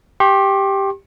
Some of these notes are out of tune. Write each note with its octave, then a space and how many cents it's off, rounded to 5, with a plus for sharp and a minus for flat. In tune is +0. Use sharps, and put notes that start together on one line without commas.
G4 +0 C6 +45